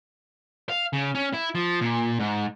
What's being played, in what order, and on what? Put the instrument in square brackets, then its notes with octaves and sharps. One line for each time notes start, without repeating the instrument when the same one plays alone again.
[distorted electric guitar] F5
C#3
C#4
E4
F3
A#2
G#2